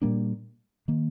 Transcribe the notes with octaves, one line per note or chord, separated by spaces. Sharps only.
A#2 G3 A#3 D4
D#3 A#3